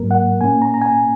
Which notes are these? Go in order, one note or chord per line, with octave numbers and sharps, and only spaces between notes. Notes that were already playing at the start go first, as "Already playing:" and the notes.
Already playing: G#2 F#3 A#3 A#4
F#5
A#2 A#3 C#4 G#5
A#5
A#5
G#5